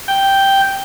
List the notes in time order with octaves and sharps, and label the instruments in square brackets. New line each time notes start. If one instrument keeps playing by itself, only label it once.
[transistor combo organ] G5